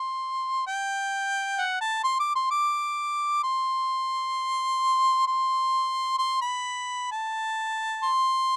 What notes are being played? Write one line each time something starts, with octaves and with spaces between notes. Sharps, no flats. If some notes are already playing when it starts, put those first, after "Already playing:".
Already playing: C6
G5
F#5
A5
C6
D6
C6
D6
C6
C6
C6
B5
A5
C6